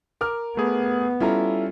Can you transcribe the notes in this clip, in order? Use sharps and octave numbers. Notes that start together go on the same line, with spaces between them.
A#4 D6 F6
A3 B3 G#4
G3 C#4 E4 F4 A4 A#5